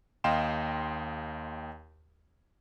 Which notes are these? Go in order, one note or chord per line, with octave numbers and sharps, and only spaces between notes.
D#2 D#5 F5 G5 C6 E7